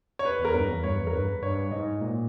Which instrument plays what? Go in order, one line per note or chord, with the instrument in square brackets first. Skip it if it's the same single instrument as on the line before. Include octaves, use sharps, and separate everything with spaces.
[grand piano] C#5
B4
[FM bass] E2 [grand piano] A#4
[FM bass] G2 [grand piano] B4
[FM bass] E2
[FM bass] G2 [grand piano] C#5
[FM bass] E2
[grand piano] A#4
[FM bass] G2 [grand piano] B4
[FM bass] G2 [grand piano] C#5
[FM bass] G#2 [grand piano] D#5
[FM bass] A#2